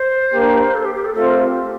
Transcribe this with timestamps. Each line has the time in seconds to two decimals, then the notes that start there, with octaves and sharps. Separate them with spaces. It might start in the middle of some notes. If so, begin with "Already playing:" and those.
Already playing: C5
0.34 A#3 D4 G4 A#4
0.74 A4
0.85 G4
0.95 G4
1.05 A4
1.15 A3 C4 F4 A4 C5
1.29 A#4
1.43 G4